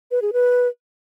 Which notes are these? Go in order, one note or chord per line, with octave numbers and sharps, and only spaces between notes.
B4
G#4
B4